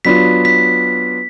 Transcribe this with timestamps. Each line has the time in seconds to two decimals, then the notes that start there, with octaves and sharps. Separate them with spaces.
0.05 F#3 B3 D4 F4 B6
0.45 B6